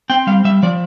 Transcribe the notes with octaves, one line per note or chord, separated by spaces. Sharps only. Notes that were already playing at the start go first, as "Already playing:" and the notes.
C4 G5
G3 F5
G3 E5
F3 D5